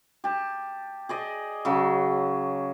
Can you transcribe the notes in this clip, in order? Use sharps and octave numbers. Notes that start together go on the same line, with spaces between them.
G4 A5
G#4 D5 D#5
C#3 F#3